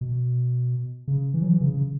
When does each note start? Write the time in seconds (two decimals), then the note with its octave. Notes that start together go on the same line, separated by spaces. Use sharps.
0.01 B2
1.08 C#3
1.34 E3
1.42 F#3
1.49 E3
1.61 C#3
1.74 C#3